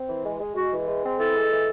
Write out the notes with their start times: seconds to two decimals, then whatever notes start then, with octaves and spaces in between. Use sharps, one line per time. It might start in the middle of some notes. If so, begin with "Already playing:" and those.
Already playing: C4
0.08 E3
0.24 G#3
0.40 G#3
0.56 G#3 F#4
0.72 E3
0.88 G#3
1.03 C4
1.19 E3 A4
1.35 G#3
1.50 E3